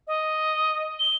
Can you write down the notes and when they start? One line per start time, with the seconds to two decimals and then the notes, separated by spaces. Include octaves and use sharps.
0.07 D#5
0.99 G7